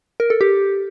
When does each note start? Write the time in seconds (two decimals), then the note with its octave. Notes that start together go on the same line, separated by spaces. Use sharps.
0.20 A#4
0.30 A4
0.41 G4